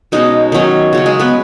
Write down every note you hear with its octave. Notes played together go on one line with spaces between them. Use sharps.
B2 G#3 C#4 D#4
D#3 F#3 C#4
C#3 F#3 C#4
G#3 G#4
B3 B4